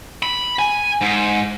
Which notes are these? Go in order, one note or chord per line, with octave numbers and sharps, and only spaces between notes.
B5
G#5
G#2